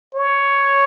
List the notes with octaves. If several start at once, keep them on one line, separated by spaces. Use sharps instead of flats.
C#5